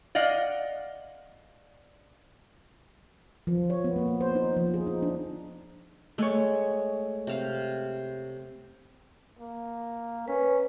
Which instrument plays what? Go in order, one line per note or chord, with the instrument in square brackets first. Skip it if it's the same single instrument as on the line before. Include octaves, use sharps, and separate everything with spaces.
[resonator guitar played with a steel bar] D5 D#5 F5 F#5
[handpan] F3
C#5
B3
A#3
C5
D#4
F3
G#4
D#4
D4
[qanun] G#3 [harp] A3 C#5
[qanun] C3 F5
[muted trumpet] A#3
[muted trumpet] C#4 [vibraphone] B4